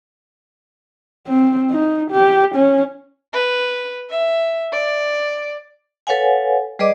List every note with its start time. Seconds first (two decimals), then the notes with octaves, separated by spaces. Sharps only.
1.28 C4
1.71 D#4
2.11 G4
2.55 C#4
3.33 B4
4.10 E5
4.72 D5
6.07 A4 B4 C#5 F5 F#5 G#5
6.79 G3 G#4 B4 D5 D#5 D6